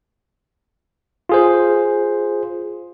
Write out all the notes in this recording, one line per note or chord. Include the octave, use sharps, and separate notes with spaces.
F4 G#4 C5